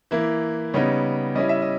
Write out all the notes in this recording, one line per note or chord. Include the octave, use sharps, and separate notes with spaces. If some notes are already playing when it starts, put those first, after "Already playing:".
E3 A#3 E4
C#3 G3 B3 D#4 C#5
G3 C#4 E4 D#5
E5
D#5